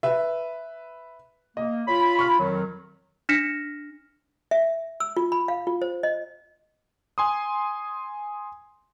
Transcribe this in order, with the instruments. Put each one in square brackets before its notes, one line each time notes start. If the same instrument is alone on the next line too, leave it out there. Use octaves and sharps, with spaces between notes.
[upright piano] B4 E5
[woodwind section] A#3 [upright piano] D#5
[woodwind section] F4 B5 [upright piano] C#5
[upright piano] C#6 F6
[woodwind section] F2 D#3 F#3
[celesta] D4 F6 A#6 B6 C#7 E7
[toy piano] E5
E6
F4
B5
F5
F4
C5
D#5
[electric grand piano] G#5 C6 D#6